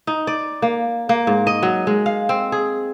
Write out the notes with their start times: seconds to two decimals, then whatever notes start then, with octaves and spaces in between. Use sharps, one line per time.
0.07 D#4
0.27 D5
0.62 A#3
1.09 A#3
1.27 G#2
1.47 D#5
1.63 F#3
1.87 G#3
2.06 F5
2.29 C4
2.52 G#4